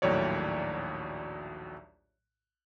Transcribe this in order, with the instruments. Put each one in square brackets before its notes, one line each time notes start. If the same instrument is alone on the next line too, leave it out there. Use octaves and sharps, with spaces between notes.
[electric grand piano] A#1 D#2 A2 F#3 C#5 D5